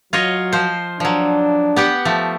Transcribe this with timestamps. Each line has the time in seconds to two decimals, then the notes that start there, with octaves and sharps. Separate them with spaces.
0.13 F#3 F4 C#5 D#5
0.53 F3 C5
1.00 F3 F#3 D4
1.76 B3 G4 F#5
2.05 F3 A3